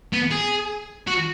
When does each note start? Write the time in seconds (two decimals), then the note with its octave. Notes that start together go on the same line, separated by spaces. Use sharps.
0.13 B3
0.31 G#4
1.07 F#4